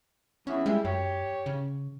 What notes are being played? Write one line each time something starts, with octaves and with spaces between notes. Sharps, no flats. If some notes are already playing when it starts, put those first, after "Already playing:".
E2 E3 C#4 E4
G3 G#3 E4
F#2 G4 C#5
C#3